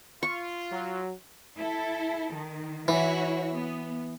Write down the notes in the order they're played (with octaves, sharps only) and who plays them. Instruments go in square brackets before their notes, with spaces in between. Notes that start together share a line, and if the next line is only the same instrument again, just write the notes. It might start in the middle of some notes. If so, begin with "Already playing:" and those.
[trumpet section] F4 [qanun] C#6
[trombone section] F#3
[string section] E4 A4
D#3
[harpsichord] E3 [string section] E4 F#4 C#5
[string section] B3